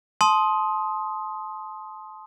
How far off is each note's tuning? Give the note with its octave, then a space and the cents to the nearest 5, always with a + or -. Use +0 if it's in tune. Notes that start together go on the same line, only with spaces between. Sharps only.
A5 -25 C6 +5 D#6 +10